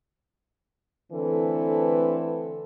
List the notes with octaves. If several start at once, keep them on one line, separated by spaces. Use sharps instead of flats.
D3 E3 A3 C4 A4 B4